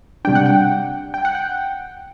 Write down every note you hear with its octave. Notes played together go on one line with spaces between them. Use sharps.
C3 G3 D4 G5
F#5
G5
G5
F#5
G5